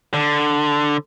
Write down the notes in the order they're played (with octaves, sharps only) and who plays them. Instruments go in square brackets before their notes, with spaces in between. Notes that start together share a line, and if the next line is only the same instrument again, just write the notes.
[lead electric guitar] D3